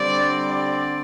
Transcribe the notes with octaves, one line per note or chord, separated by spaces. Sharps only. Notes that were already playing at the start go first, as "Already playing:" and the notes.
Already playing: D3 G3 C4 D5
D5